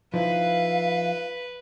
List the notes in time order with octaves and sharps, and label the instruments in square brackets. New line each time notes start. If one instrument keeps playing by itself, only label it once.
[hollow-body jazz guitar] F3 D#4 E4 [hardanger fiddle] B4 [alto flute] F5